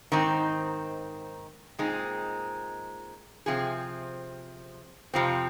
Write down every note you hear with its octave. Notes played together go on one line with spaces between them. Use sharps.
G#2 D#3 C4 D#4
A#2 G#3 C4 D#4
C3 F3 C4 G#4
F2 C3 F3 C4